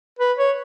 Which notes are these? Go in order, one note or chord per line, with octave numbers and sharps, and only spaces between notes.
B4
C#5